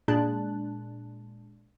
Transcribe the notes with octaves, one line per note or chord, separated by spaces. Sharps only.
A#2 G#3 D4 A5 F#6